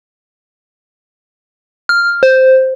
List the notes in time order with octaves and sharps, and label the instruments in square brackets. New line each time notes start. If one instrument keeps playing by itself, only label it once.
[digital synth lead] F6
C5